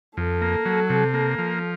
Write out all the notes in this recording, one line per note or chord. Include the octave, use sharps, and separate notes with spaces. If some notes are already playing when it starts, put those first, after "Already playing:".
F2 A4
A#3
F#3
C3
A#3
F3